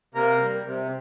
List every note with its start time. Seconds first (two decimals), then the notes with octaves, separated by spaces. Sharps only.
0.15 C3 A#3 A#4
0.41 G3
0.67 C3